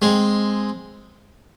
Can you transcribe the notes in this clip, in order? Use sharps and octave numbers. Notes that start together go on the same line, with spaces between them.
G#3 C4